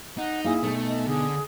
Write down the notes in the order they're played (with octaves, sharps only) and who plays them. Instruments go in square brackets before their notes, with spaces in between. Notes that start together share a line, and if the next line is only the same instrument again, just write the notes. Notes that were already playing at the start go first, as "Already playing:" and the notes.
[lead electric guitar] D#4 [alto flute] F#5
[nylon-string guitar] A#3 E4 G#5 [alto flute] G#4
[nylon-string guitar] B2 D#4 G#5 [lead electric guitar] A3
[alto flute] D#5
[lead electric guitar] D3 [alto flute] G#4